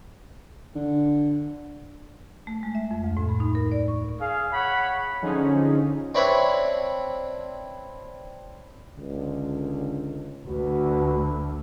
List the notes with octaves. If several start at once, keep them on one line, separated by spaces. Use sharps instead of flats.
D3
A3
G#3
E5
F2
D2
A2
B5
D#4
A#4
D5
C#6
G#4 F5
C#5 F#5 B5
D3 F3 C#4 D#4 G#4
C4 D4 E4 B4 C#5
C#2 D3
D2 F#4 B4